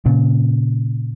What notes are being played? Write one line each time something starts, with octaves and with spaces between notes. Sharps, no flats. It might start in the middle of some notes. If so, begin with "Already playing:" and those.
A#2 C#3